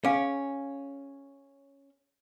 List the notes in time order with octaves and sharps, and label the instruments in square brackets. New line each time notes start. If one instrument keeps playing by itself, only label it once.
[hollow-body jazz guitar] C#4 [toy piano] G#4 F5